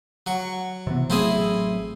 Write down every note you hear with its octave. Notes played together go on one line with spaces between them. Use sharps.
F#3 C#6
C3 E3 B3
A1 F#3 A3 C4 E4 G#4